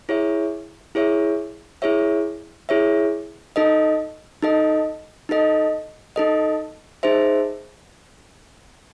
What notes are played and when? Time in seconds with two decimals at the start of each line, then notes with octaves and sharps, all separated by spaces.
0.09 E4 G#4 C#5 E5
0.95 E4 G#4 C#5 E5
1.82 E4 G#4 C#5 E5
2.69 E4 G#4 C#5 E5
3.56 D#4 A4 D#5
4.42 D#4 A4 D#5
5.29 D#4 A4 D#5
6.16 D#4 A4 D#5
7.03 D#4 G#4 C5 E5